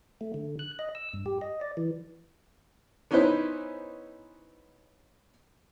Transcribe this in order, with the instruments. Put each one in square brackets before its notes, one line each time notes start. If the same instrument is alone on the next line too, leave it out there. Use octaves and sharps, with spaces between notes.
[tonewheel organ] A3
D3
F#6
D#5
E6
G2
G4
D#5
D5
E3
[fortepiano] B3 C#4 D#4 E4 B4 C5